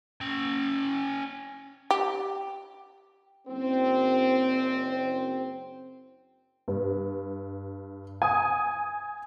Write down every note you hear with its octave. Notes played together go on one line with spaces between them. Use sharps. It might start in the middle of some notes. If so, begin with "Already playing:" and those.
C#4 G5
G4
F#1 C4
G2
G#5 D#6